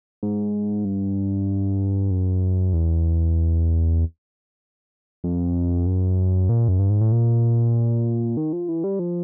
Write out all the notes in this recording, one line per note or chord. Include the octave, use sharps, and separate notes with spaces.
G#2
G2
F#2
E2
F2
F#2
A#2
F#2
G2
G#2
A2
A#2
D#3
F3
E3
G3
F3